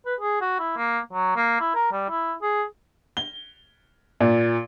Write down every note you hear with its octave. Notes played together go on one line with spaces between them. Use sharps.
B4
G#4
F#4
E4
A#3
F#3
A#3
E4
A#4
G3
E4
G#4
G7
A#2